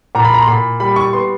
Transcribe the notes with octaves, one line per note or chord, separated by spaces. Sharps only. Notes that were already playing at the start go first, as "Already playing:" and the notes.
A#2 A#5
B5
A#5
C6
A#2 B5
G3 B5
C#6
B3 C6